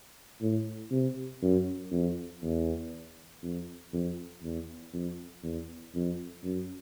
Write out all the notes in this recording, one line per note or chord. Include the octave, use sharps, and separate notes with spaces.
A2
C3
F#2
F2
E2
F2
F2
E2
F2
E2
F2
F#2